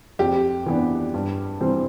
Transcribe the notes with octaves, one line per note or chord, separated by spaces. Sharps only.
F2 G4
E3 B3 D4
G2
E3 G3 C4